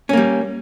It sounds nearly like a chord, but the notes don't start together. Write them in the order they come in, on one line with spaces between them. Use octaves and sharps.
C#4 A#3 G3